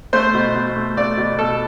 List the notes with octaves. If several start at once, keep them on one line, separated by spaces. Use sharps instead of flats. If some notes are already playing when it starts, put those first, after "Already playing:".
A3 C5
B2
B2
A3
A3 D5
B2
B2 A4